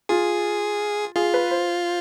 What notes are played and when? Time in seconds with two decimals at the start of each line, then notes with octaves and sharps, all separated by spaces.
0.09 F4 G#4
1.16 F4 G#4
1.34 B4
1.51 C5